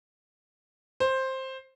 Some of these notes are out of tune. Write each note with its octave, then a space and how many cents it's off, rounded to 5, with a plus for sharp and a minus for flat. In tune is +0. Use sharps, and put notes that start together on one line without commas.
C5 +10